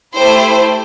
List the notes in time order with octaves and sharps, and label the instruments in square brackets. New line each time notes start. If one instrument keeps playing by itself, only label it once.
[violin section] A3 E4 G4 C5